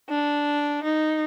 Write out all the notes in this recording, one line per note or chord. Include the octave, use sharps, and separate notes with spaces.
D4
D#4